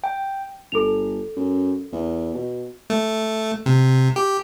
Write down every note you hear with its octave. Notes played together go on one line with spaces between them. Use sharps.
G5
G1 A4 F7
F#2
E2
B2
A3
C3
G4